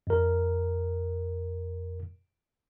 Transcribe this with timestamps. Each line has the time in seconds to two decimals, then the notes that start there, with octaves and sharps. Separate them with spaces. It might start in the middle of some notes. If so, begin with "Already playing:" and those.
0.07 F2 A#4